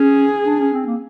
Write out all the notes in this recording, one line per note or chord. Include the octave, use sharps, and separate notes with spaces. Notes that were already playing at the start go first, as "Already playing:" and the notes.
Already playing: C#4 G#4
D4
C#4
C4
A#3